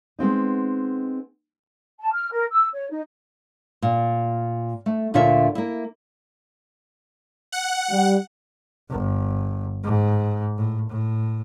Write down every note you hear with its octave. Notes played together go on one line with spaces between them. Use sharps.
G#3 B3 C4 D#4
A5
F6
A#4
E6
C#5
D#4
A#2
A3
D2 A#2 D3 F4 C#5 E5
A#3 E4
F#5
G3
G1
G#2
A2
A2